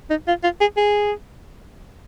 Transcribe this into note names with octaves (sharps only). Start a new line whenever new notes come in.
D#4
F4
F4
G#4
G#4